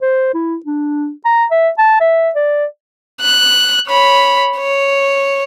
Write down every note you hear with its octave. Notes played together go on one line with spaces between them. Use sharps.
C5
E4
D4
A#5
E5
A5
E5
D5
F#6
C#5 B5
C#5